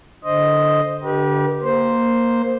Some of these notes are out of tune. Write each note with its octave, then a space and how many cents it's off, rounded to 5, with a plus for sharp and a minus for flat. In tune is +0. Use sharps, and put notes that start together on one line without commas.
D3 +0 C5 +0 D#5 +0
D3 -5 G4 -10 B4 -45
A#3 +0 C5 +0